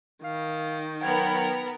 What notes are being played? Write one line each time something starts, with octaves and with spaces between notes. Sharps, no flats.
D#3 F5
F#3 B3 A#4 F#5 G5 G#6